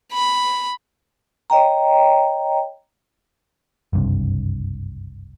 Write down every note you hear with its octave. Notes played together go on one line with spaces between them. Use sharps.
B5
C#5 D#5 G5 A#5
F#1 C2 G2 C3